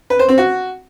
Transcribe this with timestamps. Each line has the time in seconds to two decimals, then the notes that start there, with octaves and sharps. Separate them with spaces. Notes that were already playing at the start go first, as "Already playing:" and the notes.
0.10 B4
0.19 C5
0.29 C4
0.38 F#4